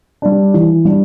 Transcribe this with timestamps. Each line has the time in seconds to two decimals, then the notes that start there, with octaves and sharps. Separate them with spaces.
0.22 G3 D4
0.54 E3
0.85 G3 D4